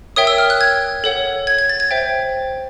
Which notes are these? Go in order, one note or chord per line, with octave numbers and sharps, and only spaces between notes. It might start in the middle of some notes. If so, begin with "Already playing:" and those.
A#4 C#5 E5 G5 D#6
E6
F6
F#6
G#6
A4 C#5 F#5
G#6
G#6
A6
G#6
C5 E5 G5